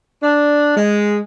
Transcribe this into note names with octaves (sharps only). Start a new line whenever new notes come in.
D4
G#3